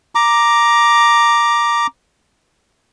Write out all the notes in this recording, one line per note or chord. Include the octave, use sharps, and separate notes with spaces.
A#5 D6